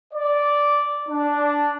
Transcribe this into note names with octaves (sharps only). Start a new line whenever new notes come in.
D5
D4